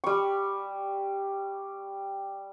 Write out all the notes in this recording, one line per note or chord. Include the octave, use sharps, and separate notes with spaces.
G3 C#6